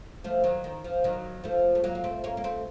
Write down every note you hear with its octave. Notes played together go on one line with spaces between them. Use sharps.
F3 A3
D#3 F#3
D#3
F3
D#3 F#3
F3 A3
A3
F#3 A#3
A#3
A3 C4
A#3 C#4
A#3
A3 C4